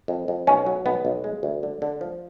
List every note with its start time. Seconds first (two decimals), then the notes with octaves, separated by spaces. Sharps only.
0.08 F2
0.28 F2
0.47 B1 C#4
0.66 F#3
0.85 B1 B3
1.05 B1
1.24 G#3
1.43 D2
1.63 D3
1.82 D3
2.01 F3